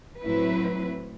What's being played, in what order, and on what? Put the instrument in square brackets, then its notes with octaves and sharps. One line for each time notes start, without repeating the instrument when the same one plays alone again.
[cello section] A2 F#3 C4 E4 B4